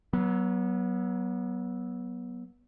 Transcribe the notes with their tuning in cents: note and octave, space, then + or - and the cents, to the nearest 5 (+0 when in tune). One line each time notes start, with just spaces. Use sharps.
F#3 +20 B3 -25